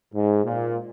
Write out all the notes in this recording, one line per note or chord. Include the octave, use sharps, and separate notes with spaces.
G#2
A#2